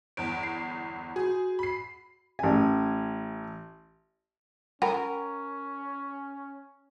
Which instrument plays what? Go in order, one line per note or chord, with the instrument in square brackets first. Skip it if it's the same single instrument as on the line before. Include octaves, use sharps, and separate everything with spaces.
[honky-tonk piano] G1 E2 [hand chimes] D7
[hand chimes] C7
[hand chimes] F#4 [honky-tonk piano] G#4
[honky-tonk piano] B5 C7
[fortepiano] A1 G#5
[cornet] C#4 [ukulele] A#4 [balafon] F#5 G5 B5